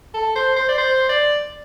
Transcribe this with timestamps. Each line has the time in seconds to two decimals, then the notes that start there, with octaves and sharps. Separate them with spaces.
0.14 A4
0.35 C5
0.56 C5
0.68 D5
0.78 C5
1.09 D5